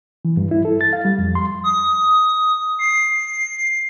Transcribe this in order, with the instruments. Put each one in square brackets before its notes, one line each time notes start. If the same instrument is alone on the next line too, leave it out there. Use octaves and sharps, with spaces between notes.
[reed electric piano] E3
G2
E4
A4
A6
F5
G3
F2
C6
[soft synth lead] D#6
C7